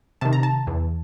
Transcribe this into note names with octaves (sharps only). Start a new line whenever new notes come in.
C3 D#3 A5
A#5
A5
E2